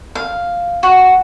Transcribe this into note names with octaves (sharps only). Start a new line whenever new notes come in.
F5
F#4